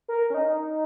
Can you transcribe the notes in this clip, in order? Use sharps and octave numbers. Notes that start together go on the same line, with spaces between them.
A#4
C#4
D#4